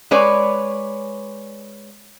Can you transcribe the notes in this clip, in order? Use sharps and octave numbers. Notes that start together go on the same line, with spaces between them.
G#3 B4 C#5 D5